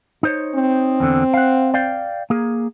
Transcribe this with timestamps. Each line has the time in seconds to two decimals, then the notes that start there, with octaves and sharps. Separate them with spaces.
0.23 D#4 C5 C#5
0.55 C4
1.00 E2 D3
1.34 F5 F#5
1.74 D5 F5 G5
2.30 A#3 G#4